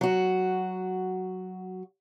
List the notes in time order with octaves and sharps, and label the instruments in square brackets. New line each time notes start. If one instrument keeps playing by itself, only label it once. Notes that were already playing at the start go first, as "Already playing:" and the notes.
[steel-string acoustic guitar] F#3 F#4